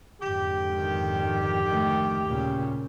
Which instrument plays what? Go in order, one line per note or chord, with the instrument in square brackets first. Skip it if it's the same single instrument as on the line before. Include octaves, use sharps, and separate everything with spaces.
[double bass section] F2 G#2 D3 [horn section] G4
[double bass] D#3
D#3 A3
[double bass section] D#2 [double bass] A#2 C#3